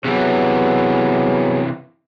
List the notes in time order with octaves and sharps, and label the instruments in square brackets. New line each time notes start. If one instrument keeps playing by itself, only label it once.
[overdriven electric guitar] C3 E3 [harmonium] F#3 B3 G#4